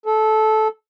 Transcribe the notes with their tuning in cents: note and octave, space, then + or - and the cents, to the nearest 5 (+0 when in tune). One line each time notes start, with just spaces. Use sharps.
A4 -15